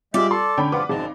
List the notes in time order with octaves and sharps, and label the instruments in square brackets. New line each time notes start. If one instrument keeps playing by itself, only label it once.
[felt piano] G3 F4 [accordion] G#3 E5 G6 [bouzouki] D5
[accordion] A4 [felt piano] C6
[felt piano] D3 B5 [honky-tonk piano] C#4 G5
[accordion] G2 F3 F4 [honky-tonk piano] B4 F#5 [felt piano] D6
[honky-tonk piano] G#1 D#4 [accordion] F#2 C4 A5